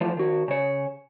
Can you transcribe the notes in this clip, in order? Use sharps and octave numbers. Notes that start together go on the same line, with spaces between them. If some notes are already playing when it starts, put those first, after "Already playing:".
E3 F3 A3 F4
D#3 F#4
C#3 C#5